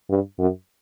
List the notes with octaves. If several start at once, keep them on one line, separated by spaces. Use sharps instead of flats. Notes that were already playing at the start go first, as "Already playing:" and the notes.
G2
F#2